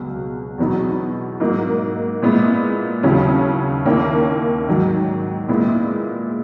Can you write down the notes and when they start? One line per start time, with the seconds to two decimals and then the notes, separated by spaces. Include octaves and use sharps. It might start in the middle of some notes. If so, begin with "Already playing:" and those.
Already playing: C#2 B2 F#3
0.58 E2 B2 F#3 B3 D#4
1.40 G#2 F#3 A#3 D#4
2.22 A#2 G#3 B3 E4
3.03 D#2 C#3 F#3 C#4 E4
3.85 D#2 D#3 A#3 C#4 E4
4.67 G#2 D#3 F#3
5.48 A#2 G#3 B3 E4